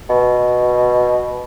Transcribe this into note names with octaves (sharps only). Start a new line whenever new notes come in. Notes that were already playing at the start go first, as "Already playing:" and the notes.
B2